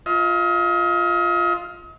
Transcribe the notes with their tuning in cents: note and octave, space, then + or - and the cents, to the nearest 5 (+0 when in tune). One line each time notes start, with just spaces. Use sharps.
F4 +0 D#5 +40